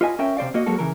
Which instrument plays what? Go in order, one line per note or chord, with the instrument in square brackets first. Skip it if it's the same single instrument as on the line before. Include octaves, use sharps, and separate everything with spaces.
[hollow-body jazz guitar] F4 B4 D#5 G#5
C#4 A#4 E5 G5
C3 C5 D5 F5
A#3 F#4 D#5
F#3 G#3 A#3 F#4 A4
C#3 E3 A#4